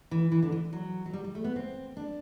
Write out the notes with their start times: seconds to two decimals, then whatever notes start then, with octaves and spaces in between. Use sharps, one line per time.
0.11 E3
0.32 E3
0.43 D3
0.52 E3
0.73 F#3
1.06 F#3
1.13 G3
1.24 G3
1.35 A3
1.44 B3
1.56 C4
1.97 D4